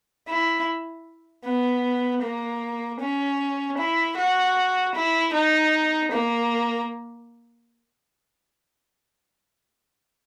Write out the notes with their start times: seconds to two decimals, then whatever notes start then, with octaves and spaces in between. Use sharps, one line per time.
0.28 E4
1.44 B3
2.22 A#3
3.00 C#4
3.78 E4
4.17 F#4
4.95 E4
5.33 D#4
6.11 A#3